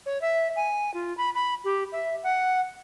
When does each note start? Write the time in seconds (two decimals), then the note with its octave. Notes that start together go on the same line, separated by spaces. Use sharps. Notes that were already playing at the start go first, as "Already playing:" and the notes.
0.06 C#5
0.22 E5
0.56 G#5
0.94 F4
1.17 B5
1.35 B5
1.64 G4
1.92 E5
2.23 F#5